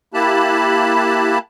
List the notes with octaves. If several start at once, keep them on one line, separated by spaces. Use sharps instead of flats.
A#3 E4 G4 A5 B5 F#6